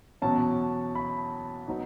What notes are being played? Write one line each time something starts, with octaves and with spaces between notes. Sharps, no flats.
E2 B2 F#3 C#4 A5
B5
F#3 B3 D#4